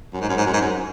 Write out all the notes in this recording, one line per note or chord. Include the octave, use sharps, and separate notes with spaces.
F#2
G#2
F#2
G#2
F#2
G#2
F#2